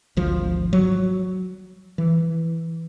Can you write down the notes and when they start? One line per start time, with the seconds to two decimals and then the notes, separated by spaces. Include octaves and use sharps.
0.17 G#1 D2 F3
0.73 F#3
1.98 E3